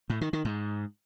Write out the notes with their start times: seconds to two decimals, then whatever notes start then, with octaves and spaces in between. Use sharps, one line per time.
0.10 A2
0.21 D#3
0.33 D#3
0.45 G#2